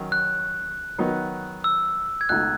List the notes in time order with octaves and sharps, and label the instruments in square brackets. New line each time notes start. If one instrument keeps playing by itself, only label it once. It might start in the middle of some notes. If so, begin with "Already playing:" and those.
Already playing: [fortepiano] D#3 F#3 C#4
[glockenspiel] F#6
[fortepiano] D#3 F#3 B3 D#4
[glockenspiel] E6
G#6
[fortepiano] C#2 B2 A3 D#4 [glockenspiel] F#6